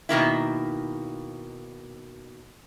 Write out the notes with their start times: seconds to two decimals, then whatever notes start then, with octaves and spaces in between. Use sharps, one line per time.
0.09 B2 D#3 A#3 E4